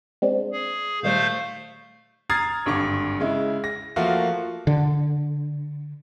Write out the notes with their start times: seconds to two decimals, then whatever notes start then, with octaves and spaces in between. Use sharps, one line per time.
0.22 G#3 C4 D4
0.53 G#4
1.03 A#2 D#3 G3 A3 C5 F5
2.30 A#5 D#6 F6 G#6 A6 C7
2.66 G#1 G2 D3 C#6 D6
3.20 C#3 G#3 E4
3.64 A#6
3.96 F3 A3 A#3 F4 F#4
4.67 D3